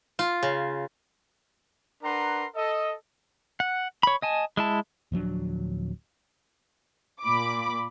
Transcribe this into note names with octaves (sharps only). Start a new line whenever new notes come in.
F4
C#3
D4 A#4 B4 F#5 A#5 C6
A4 D#5
F#5
C#5 B5
D#5 G#5 A5
G#3 E4 A5
D1 F3 F#3 D4
A#2 B5 D6